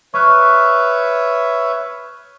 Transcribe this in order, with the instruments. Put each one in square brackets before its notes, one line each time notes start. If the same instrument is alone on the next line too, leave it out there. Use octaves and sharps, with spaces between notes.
[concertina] B4 C#5 E5 [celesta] C#6 F6 F#6